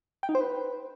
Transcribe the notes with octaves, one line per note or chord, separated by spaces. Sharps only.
G5
D#4
C5
B4